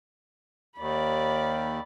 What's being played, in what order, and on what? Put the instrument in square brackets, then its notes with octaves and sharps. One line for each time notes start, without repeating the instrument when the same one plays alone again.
[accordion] D#2 [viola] D5 B5